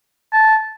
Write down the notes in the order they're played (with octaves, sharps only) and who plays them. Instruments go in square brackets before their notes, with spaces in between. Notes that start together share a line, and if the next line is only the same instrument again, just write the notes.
[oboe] A5